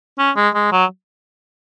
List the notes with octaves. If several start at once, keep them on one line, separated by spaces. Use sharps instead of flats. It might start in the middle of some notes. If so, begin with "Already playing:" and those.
C#4
G#3
G#3
F#3